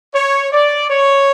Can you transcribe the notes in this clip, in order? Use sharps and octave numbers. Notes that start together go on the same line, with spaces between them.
C#5
D5
C#5